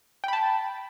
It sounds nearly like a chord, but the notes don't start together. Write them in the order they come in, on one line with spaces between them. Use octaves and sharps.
G5 B5 A5